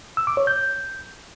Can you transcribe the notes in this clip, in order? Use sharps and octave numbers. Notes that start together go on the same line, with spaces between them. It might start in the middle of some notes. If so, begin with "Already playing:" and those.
E6
D6
C#5
G6